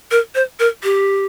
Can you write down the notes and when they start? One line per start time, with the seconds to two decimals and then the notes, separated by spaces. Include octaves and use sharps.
0.11 A#4
0.35 C5
0.60 A#4
0.84 G4